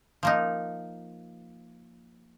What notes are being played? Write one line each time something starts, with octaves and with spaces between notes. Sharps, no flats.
F3 A#3 D#4